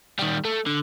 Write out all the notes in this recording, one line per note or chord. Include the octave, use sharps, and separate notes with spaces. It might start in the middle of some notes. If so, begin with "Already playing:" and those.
D#3 G3
A3
D3